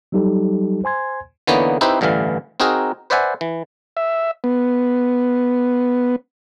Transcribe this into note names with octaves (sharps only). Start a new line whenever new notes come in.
F#3 G3 D#4 G4 A4
C5 G#5 C6 G#6
D3 E3 A#3 B3 D#4 C#5
C4 D#4 E4 G4 B4 C5
A1 G2 D3 E3 F5
C4 D#4 F#4 G#4 A#4
B4 C5 D5 E5 F#5 G#5
E3
E5
B3